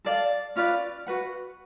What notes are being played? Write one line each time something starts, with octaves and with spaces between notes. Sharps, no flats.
A4 D5 F5
C#4 F4 B4 D5
F#4 B4 F#5